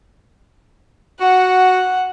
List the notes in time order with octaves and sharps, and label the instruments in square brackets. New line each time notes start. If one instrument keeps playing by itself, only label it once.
[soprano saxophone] F#4 [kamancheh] F#5